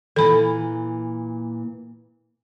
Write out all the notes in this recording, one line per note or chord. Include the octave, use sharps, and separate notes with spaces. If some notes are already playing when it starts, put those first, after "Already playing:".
A#2 E3 A4 B5